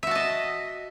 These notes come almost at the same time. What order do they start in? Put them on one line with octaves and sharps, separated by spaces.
E5 F#4 A5 D#5